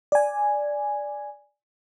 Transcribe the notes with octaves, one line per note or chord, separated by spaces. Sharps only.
D5 G#5